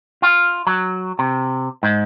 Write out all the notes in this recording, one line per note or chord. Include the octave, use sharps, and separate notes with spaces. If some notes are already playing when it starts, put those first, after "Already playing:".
F4
F#3
C3
G#2